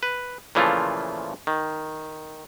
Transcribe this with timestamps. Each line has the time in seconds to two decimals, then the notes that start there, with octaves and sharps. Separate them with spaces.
0.03 B4
0.55 A#2 C#3 E3 F3 A3 F4
1.47 D#3